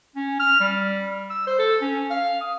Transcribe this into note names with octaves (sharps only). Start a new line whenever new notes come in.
C#4
F6
G3
E6
C5
A4
C#4
F5
D#6